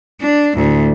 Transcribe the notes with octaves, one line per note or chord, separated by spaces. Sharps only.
D4
D2 A2